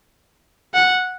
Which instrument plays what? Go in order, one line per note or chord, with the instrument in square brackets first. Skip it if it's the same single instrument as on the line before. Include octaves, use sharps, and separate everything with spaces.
[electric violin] F#5